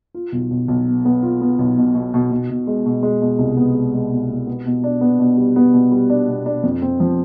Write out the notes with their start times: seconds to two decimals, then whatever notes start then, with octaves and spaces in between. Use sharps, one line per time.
0.14 F4
0.32 B1
0.51 B1
0.68 B1
0.87 B3
1.05 B3
1.23 F4
1.41 B3
1.59 B1
1.77 B2
1.95 B2
2.14 B2
2.31 B2
2.50 B2
2.67 G#3
2.86 B2
3.03 G#3
3.21 B2
3.39 C2
3.57 B3
3.75 G#3
3.94 G#3
4.12 B2
4.30 B2
4.47 B3
4.66 B2
4.84 D4
5.01 B3
5.19 B2
5.37 G3
5.56 B3
5.74 B2
5.92 G3
6.10 D4
6.28 B2
6.46 D4
6.63 F2
6.82 C4
7.00 F3